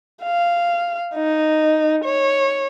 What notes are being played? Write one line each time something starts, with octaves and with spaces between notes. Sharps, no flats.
F5
D#4
C#5